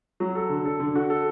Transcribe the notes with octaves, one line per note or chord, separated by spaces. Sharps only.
F#3
A4
D3
A4
D3
F#4
A4